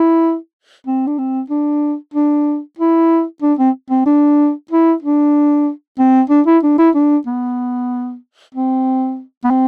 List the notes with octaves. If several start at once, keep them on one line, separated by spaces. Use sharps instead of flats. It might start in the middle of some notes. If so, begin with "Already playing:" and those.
Already playing: E4
C4
D4
C4
D4
D4
E4
D4
C4
C4
D4
E4
D4
C4
D4
E4
D4
E4
D4
B3
C4
B3
C4